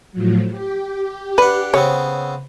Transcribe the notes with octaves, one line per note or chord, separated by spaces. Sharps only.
A2 F3 F#3
G4
D4 B4 F#5
C#3 B3 C4 C#5